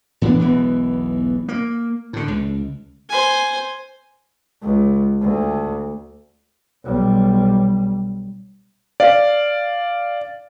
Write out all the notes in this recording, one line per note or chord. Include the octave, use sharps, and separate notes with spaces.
A2 E3 B3 D4
E1 B1 E3 B3
A#3
A2 D3
C#2
C5 G#5
C#2
D2
B1 G3
D5 F5